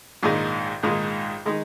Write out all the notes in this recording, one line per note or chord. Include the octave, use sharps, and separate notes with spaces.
A#1 G#2 D#3 G#3 D#4
A#1 G#2 D#3 G#3 D#4
D#3 G#3 D#4